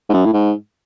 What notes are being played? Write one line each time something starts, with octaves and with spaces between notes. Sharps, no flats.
G#2
F#2
A2
G#2